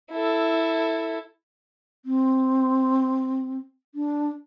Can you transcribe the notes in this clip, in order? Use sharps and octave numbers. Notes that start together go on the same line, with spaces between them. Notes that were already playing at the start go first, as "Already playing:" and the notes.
E4 A4
C4
D4